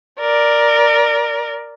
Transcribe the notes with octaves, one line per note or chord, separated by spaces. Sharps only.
A#4 D5